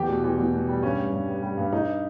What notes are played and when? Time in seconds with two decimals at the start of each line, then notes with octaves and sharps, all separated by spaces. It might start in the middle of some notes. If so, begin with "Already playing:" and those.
Already playing: E2 G4
0.09 B2
0.24 E2
0.38 E2
0.53 B2
0.69 G3
0.83 G2 C#4
0.98 G3
1.13 G2
1.27 G3
1.43 G3
1.57 G2
1.72 G2 D#4